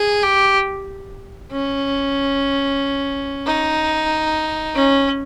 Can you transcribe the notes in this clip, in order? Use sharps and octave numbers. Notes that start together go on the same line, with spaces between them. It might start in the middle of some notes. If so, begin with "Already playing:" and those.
Already playing: G#4
G4
C#4
D#4
C#4